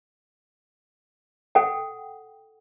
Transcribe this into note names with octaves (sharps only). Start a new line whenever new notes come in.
A4 F#5 G5